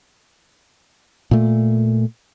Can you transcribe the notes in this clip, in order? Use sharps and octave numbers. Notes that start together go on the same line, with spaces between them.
A#2 A3